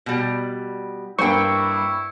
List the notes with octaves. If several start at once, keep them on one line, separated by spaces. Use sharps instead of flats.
B2 G3
G2 A#3 E4 C5 G5 C#6